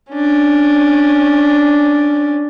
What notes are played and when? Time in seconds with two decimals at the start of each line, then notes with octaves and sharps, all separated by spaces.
0.12 C#4 D4